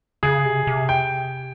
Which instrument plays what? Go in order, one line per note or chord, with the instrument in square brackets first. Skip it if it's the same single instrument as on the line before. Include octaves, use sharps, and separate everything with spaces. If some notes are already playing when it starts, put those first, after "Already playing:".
[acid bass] C#3 [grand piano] G#4
[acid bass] C3
C3
[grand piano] G5